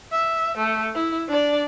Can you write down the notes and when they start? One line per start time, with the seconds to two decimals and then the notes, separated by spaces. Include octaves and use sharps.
0.12 E5
0.58 A3
0.95 E4
1.29 D4 D5